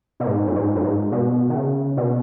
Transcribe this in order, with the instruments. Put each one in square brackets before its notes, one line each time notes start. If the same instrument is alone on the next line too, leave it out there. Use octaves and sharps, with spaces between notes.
[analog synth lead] B2
G#2
F#2
G#2
F#2
G#2
B2
D#3
C#3
B2